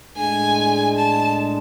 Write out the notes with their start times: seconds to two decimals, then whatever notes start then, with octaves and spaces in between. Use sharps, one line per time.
0.17 A2 G#3 D4 G#5
0.97 A5